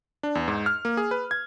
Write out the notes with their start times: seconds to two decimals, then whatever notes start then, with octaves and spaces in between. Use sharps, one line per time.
0.23 D4
0.35 E2
0.48 G#2
0.66 F6
0.85 A#3
0.97 G#4
1.11 B4
1.31 G#6